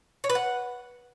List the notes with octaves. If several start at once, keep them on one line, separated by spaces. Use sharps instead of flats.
C#5
B4
F#5